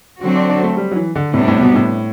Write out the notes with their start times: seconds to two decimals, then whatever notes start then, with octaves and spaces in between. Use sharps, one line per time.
0.21 D3 F#3 C4 F#4
0.36 D4
0.50 D4
0.64 A3
0.77 G3
0.91 F#3
0.96 E3
1.15 D3
1.34 A2 C3 G3 B3 D4
1.48 A2
1.62 B2
1.75 A2